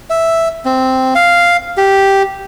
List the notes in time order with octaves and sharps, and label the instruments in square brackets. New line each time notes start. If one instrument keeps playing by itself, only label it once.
[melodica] E5
C4
F5
G4